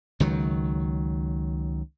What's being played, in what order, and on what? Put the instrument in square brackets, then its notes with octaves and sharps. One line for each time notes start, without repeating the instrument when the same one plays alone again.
[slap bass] C#2 D#3 F#3